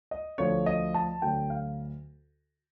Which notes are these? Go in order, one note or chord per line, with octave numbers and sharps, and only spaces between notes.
D#5
D2 D3 F3 C#5
D#5
A5
D2 D3 F#3 G5
F5